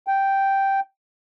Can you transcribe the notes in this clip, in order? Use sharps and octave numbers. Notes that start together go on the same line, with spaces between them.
G5